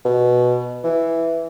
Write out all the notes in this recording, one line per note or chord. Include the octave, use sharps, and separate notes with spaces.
B2
E3